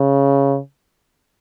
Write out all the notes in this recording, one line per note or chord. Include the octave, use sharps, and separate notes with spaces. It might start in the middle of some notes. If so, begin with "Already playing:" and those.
Already playing: C#3